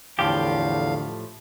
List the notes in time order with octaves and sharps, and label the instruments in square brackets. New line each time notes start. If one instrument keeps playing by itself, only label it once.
[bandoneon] E2 F5 [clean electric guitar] A2 F3 G4 [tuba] D3